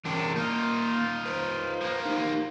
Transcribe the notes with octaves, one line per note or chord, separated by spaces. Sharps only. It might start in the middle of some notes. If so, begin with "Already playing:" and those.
C3 E3 C#4 D4 A#4
A#3 D#4 F4
B4 C5 A#5
F3 A#3
D#4 G4